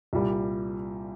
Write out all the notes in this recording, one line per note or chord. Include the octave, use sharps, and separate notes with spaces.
C2 A#2 G3